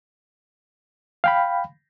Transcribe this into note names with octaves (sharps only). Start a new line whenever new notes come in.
F5 G5 B5